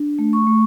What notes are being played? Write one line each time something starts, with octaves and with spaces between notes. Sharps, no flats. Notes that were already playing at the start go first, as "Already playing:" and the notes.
Already playing: D4
A3
C#6
A3